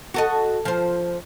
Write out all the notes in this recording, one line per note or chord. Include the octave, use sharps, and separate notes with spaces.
F#4 A4 D#5
F3 C5